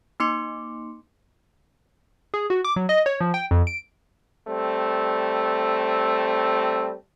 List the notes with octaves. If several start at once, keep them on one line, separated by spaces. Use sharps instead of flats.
A#3 D#4 C6 D6 C#7
G#4
F#4
D6
F#3
D#5
C#5
F3
G5
F2
D7
G3 A3 C4